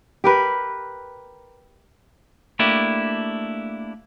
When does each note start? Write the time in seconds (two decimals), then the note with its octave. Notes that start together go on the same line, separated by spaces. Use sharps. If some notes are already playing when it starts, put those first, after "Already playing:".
0.24 G4 A#4 B4
2.59 A3 A#3 D4 E4 G4